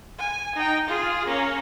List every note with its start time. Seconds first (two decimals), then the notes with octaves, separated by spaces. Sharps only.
0.18 G#5
0.55 D#4 G5
0.87 F4 G#4
1.27 A#3 C#4